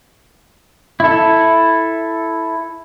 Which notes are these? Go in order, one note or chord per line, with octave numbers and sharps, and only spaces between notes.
E4 A4